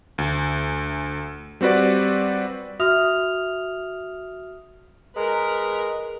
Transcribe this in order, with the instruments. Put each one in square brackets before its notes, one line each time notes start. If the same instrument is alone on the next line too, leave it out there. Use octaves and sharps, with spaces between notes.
[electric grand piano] D2
G3 C4 F#4 B4 D5
[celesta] F#4 E5 D#6 F6 F7
[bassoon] G#3 [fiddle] A#4 B4